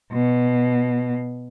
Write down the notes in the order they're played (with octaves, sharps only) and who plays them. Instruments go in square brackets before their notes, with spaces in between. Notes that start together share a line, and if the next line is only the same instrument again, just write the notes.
[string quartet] B2